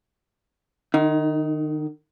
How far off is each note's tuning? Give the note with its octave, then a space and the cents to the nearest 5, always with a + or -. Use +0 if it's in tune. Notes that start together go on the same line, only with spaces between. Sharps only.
D#3 -35 D#4 +15